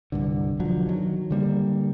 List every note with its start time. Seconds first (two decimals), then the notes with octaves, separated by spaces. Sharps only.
0.12 C2 G2 D3
0.60 B2 D3 F3 F#3
0.87 D#3 F3 F#3
1.31 D3 G3 A#3